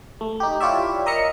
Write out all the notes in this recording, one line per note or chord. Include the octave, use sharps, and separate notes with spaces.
A3
D#4 G4
E4 F4 G4 C#5 D5 E5
A#4 D#5 E5 A#5 C#7